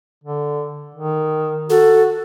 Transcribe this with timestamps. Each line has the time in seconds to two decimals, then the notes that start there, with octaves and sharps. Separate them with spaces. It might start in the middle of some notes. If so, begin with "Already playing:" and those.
0.24 D3
0.94 D#3
1.70 F#4 A4